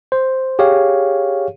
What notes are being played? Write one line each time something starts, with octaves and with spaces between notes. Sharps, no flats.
C5
G4 G#4 C#5 F5